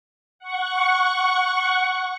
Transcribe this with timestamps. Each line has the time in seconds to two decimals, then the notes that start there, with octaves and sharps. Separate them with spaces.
0.39 F#5 C#6